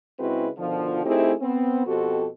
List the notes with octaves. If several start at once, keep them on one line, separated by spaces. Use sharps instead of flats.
C#3 G#3 C4 E4 F#4 B4
B2 D3 D#3 F3
A3 C4 D#4 E4 G4 G#4
B3 C4
F2 B2 C4 F#4 G4 A4